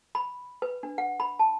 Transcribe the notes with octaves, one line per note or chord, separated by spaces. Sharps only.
B5
B4
D4
F#5
B5
A5